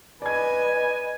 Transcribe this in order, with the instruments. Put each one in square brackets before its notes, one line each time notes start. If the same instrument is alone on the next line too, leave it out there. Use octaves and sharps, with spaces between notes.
[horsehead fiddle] B4 D#5 [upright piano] D5 G#6 [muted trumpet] G#5